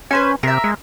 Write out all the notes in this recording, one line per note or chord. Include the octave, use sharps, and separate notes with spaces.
C#4 B4 C5 G#5
C3 A#4 E5
G#3